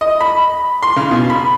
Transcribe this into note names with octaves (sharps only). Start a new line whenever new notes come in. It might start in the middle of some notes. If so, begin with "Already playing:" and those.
D#5
B5
C6
C#3
B2
B5